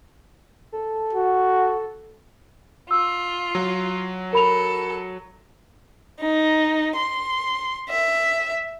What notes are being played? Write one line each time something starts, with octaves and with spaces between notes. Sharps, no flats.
A4
F#4
F4 E6
F#3
A4 A#4 B5 F7
D#4
C6
E5